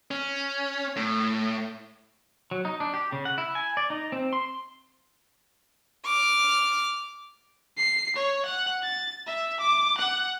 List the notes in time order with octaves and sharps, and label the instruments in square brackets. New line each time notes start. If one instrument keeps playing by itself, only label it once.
[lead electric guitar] C#4
A2
[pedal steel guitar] F#3
D#4
D4
G4
C#3
F#5
E4
G#5
D5
D#4
C4
C6
[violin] D6 F6
[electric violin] C7
C#5
F#5
A6
E5
D6
F#5